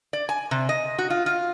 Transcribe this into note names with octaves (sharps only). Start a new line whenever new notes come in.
D5
G#5
C3
D#5
F#4
F4
F4